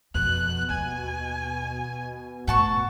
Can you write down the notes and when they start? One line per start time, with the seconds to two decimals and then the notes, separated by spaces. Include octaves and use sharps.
0.15 F2 B2 F#6
0.70 D#2 G#5
2.48 G1 A2 F#4 A5 C#6